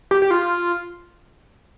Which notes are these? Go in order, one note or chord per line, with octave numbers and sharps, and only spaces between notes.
G4
G4
F4